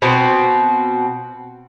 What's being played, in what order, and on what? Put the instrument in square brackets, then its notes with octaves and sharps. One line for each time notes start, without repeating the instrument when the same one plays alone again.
[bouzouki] B2 C4 F#4